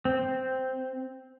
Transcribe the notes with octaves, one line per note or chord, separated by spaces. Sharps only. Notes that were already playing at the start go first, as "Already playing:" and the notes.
C4